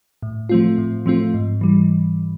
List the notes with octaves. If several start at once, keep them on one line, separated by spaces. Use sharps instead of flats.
A2
F3 A3 C4 F4
A2
F3 A3 C4 F4
G#2
E3 G3